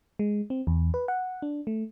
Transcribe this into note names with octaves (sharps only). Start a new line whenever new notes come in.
G#3
C4
E2
B4
F#5
D4
A3